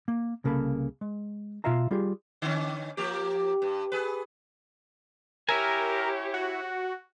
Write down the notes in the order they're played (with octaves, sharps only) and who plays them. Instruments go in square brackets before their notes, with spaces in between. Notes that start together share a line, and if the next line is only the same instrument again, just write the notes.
[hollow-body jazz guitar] A#3
C2 C#3 A#3 A4 B5
G#3
B2 F4 E5 F5 A#5
G3 F4 G4 G#4
[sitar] D3 C#4
F3 A#3 G4
G2
G#4 B4
[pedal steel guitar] E4 E5 G#5 [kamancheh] G4 C#5 [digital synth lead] A#4
[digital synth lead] F#4